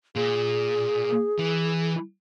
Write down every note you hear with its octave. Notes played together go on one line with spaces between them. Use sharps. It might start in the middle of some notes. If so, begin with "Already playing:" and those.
A#2 G#4
E3